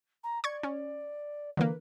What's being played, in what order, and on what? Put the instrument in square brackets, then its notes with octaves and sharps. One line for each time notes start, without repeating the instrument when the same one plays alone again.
[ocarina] A#5
[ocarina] D5 [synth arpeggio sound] C#6 G#6
[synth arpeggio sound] C#4
[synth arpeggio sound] D3 E3 A#3 [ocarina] B4